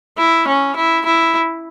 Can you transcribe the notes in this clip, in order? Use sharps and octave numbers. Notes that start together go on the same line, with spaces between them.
E4
C#4
E4
E4